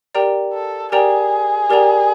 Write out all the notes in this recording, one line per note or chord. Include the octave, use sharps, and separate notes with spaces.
G4 A#4 D5 G5 A#5
A4
G4 G#4 A#4 D5 G5 A#5
G4 A#4 D5 G5 A#5